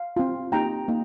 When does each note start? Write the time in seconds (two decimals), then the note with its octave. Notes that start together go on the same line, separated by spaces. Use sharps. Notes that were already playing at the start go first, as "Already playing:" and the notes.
Already playing: F5
0.16 C4 F4
0.52 A#3 D#4 G4 G5 A#5
0.88 A#3 D#4